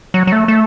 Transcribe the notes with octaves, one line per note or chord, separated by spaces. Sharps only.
F#3
F#3
A3
A3